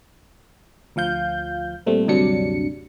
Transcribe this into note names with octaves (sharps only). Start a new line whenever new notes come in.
D2 F3 F5 G6
A#2 G3 A3 C4
D2 G2 C3 F#3 D4 C#7